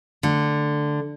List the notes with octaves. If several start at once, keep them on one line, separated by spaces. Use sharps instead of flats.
D3 A3